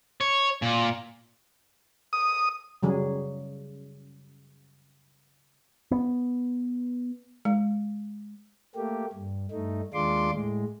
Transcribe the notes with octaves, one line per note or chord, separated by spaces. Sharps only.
C#5
A#2
D#6
C#3 F#3 G3 G#4
B3
G#3
A3 A#3 G4
G2
G2 A3 D#4
D#2 G#3 D4 F4 C6 D6
A2 G#3